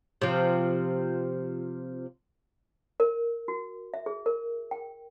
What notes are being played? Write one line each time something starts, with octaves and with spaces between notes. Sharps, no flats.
C3 F3
A#4
F#4
E5
G#4
A#4
G5